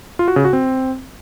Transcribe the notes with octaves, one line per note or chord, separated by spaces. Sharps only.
F4
F#4
C#3
F#4
C4